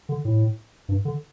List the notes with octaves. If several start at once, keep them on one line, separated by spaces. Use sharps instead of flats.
D3
A2
G2
D3